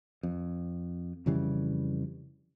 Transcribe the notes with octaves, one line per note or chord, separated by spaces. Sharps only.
F2
F2 C#3 E3 G3